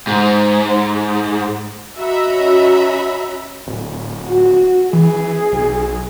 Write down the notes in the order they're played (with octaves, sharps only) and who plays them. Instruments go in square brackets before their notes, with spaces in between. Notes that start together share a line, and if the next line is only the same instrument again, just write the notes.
[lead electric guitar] G#2
[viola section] F#4 E5 [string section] D#5 A#5 B5
[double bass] C#4
[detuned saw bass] D1
[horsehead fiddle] F#4
[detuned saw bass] E3 [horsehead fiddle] G#4
[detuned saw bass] B1